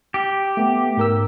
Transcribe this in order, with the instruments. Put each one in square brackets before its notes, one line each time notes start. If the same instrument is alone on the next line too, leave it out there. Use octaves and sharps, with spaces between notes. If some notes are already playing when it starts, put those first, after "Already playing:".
[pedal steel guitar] G4
[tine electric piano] A3 B3
G#2 A#4 E6